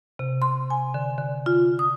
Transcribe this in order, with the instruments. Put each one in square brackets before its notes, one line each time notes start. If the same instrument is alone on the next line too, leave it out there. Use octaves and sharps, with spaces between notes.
[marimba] C3
C6
G#5
D3
D3
F4
D#6